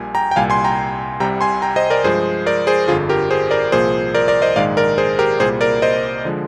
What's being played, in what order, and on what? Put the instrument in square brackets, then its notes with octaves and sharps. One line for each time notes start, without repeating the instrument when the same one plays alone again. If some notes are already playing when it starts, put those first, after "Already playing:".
Already playing: [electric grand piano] A#1 A#2 G3 A#3 G#5
G5 A#5
G5
C2 A#2 G3 F5 G#5
G#5 C6
G5 A#5
C2 C3 G3 G5 A#5
G#5 C6
G5 A#5
C5 D#5
A#4 D5
G2 F3 G#3 G#4 C5
A#4 D5
G#4 C5
G1 F2 D3 F4 G#4
G4 A#4
G#4 C5
A#4 D5
C2 A#2 F3 A#3 G#4 C5
A#4 D5
A#4 D5
C5 D#5
A#1 G#2 D#3 G#3 D5 F5
A#4 D5
G#4 C5
G4 A#4
C2 A#2 G3 A#3 G#4 C5
A#4 D5
C5 D#5
D3 F3 G#3